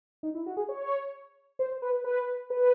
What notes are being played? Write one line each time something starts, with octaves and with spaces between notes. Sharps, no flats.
D#4
E4
F#4
G#4
C#5
C5
B4
B4
B4